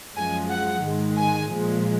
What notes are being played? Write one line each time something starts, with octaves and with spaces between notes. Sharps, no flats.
F#2 F3 G#3 G#5
F#5
G#2 D#3 G#3
G#5
A#2 F3 G#3